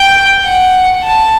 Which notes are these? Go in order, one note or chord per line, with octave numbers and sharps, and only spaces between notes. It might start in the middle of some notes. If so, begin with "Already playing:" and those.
Already playing: G5
F#5
A5